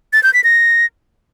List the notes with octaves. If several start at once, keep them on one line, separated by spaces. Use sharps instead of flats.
A6
G6
B6
A#6